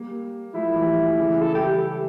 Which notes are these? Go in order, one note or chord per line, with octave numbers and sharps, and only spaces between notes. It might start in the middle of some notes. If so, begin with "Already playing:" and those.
Already playing: G3 A#3
F3 A3 E4
E3 G3
C#3 E3
A4
G3 G4